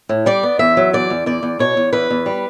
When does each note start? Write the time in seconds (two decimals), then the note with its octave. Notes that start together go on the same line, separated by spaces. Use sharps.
0.09 A2
0.26 G3 D5
0.43 B3
0.59 E2 E5
0.77 F#3
0.93 E2 D5
1.10 E2
1.26 E2 D5
1.43 E2
1.59 B2 C#5
1.77 E2
1.93 E2 B4
2.10 E2
2.26 G3